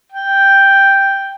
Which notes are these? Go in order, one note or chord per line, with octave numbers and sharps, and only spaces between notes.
G5